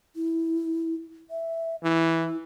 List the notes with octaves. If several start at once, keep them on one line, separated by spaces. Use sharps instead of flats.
E4
E5
E3 E4